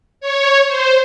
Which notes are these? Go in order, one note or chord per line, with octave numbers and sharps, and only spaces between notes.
C#5
C5